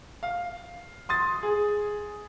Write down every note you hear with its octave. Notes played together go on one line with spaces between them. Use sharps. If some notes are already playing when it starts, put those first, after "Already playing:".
F5
C6 D#6 A6
G#4